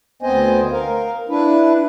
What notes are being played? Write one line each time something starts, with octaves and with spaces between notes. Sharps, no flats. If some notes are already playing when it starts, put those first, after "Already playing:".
D2 B3 C4 C5 D#5 G#5
A#4 F5
D4 E4 B4